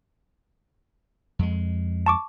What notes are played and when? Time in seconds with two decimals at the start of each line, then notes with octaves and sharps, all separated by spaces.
1.39 F2 G#3
2.06 A5 C#6 D6